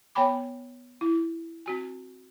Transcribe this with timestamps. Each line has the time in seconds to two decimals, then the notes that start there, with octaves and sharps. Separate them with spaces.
0.15 B3 C#5 G5 G#5 B5 D6
1.01 E4
1.66 C4 F#4 G#5